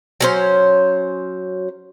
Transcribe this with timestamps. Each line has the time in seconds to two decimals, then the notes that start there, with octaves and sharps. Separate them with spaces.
0.21 F#3 C#4 C5